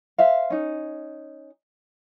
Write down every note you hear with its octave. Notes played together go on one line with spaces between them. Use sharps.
C5 E5 F5
C#4 D#4